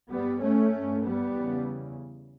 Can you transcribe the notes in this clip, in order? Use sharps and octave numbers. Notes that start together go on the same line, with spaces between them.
G2 G3 B3
A3 C#4
G2
G3 B3
E2 C#3